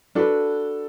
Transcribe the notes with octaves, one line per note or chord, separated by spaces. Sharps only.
D4 F#4 A4 B4